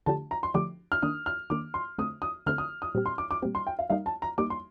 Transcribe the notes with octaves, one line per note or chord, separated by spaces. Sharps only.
D3 F3 A3 D4 G4 A5
A#5
C6
D3 F3 A3 D4 G4 D6
F6
D#3 A#3 D4 D#6
F6
D#3 A#3 D4 D6
C6
D3 A3 C4 D#6
D#6
D3 A3 C4 F6
D#6
D#6
A#2 G3 C4 G4
C6
D6
D6
A#2 G3 C4 G4
C6
G5
F5
G3 A#3 D#4 F5
A5
A#5
G3 A#3 D#4 D6
C6